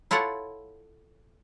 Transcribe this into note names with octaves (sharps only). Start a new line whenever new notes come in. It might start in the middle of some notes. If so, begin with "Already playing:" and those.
E4 F4 A4 C#5 F#5